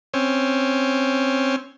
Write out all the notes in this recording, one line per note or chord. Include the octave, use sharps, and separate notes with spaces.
C4 C#4